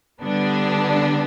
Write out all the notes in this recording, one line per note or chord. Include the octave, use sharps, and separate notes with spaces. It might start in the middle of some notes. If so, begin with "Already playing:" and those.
D3 G3 B3 D4